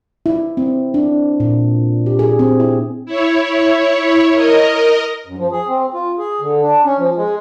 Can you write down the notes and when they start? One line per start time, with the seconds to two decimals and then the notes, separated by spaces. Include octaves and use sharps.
0.26 E4
0.57 C4
0.94 D4
1.40 A#2
2.06 G4
2.19 G#4
2.39 C4
2.60 E4
3.06 E4 C#5
4.35 A#4 D#5
5.27 F#2
5.38 F3
5.52 G#4
5.68 C4
5.94 F4
6.18 G#4
6.41 D3
6.61 D4
6.85 C#4
6.98 F3
7.16 G#3